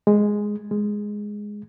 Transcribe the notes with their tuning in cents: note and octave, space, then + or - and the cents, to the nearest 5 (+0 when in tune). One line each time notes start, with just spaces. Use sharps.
G#3 +0
G#3 +0